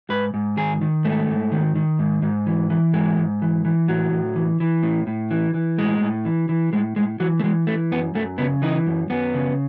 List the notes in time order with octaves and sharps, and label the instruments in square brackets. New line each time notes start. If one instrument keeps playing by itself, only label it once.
[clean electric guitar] G#2 B4
G#2
D#3 G#4
D#3
G#2 A3
G#2
D#3
D#3
G#2
G#2
E3
E3
G#2 G#3
G#2
E3
E3
A2 F#3
A2
E3
E3
A2
A2
E3
E3
A2 G#3
A2
E3
E3
A2 G#3
A2 G#3
E3 F#3
A3
E3 G#3
E3 A3
F#2 B3
F#2 A3
C#3 B3
E3 D#4
F#2
F#2 B3
C#3